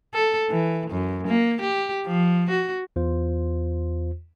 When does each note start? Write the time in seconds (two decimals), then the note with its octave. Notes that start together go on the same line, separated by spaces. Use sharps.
0.14 A4
0.50 E3
0.90 F#2
1.27 A#3
1.61 G4
2.06 F3
2.50 F#4
2.96 E2 F4 C5